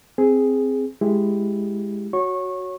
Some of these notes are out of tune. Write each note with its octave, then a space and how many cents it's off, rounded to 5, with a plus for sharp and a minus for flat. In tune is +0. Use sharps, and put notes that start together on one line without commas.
C4 +0 G#4 +0
G#3 +0 E4 +0 G4 +0
F#4 +0 C#5 +0 C#6 -20